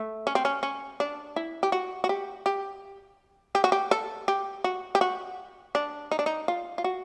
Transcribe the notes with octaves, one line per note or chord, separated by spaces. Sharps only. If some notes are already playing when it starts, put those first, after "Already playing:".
Already playing: A3
C#4
C4
C#4
C#4
D4
E4
G4
F#4
F#4
G4
G4
G4
F#4
G4
A4
G4
F#4
G4
F#4
D4
D#4
D4
D#4
F4
F4
F#4